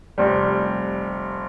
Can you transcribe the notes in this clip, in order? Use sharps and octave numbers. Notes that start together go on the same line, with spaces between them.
F1 G3